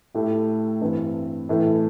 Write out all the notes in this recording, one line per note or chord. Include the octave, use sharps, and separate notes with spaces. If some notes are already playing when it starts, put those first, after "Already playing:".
A2 A3 E4 G4
G2 E3 C4
A2 E3 A3